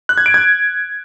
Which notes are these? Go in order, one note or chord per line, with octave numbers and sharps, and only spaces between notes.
F#6
G#6
D7
G#6